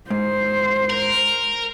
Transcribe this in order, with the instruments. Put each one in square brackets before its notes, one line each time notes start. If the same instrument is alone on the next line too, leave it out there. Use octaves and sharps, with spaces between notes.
[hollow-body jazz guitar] G#2 [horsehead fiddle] C5
[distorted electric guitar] A#4